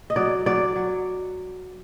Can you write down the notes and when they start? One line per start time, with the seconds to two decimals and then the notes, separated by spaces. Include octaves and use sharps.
0.10 D#5
0.16 F#3 D5
0.46 F#3 D5
0.76 F#3